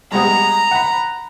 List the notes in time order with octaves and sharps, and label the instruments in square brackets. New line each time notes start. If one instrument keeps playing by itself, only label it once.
[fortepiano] G3 G#3 B3 [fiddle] A#5
[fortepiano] F#5 B5